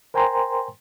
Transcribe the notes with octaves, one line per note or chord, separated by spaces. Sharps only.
A#4 C5 G5 G#5 A#5 C6